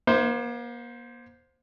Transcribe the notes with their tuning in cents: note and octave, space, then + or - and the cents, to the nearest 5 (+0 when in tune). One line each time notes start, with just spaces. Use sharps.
A#3 +40 C5 -5 E5 +0